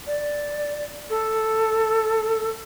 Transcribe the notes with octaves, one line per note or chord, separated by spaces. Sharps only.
D5
A4